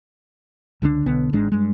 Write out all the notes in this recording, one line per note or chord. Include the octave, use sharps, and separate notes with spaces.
C#2 D3 D#3 D4
B1 D3 B3
G#1 G#2 G#3 D4
G2 G#3